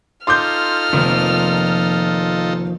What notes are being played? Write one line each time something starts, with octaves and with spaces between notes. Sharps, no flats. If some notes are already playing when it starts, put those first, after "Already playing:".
D#4 F4 A4 C6 D6 F6 G6
F1 D#3 F3 A#3